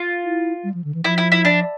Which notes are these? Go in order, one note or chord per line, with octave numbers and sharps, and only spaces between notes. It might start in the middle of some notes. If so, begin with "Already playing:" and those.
Already playing: F4
E4
G3
F3
D3
E3
F3 E4
E4
E4
D4